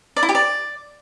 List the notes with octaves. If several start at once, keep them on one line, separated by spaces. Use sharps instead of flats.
D5
E4
G4
D5